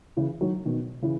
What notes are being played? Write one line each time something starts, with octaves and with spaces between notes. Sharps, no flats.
C#3 E3
D#3 F#3
B2 D#3
C#3 E3